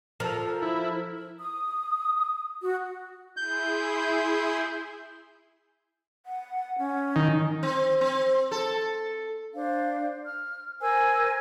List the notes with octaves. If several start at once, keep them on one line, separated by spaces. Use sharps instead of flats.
F3 A4 A#4
E4
D#6
F#4
E4 G#4 C6 G6
F#5
C#4
D#3
C4
C4
A4
D4 C5 F5
F6
A#4 C5 G#5 E6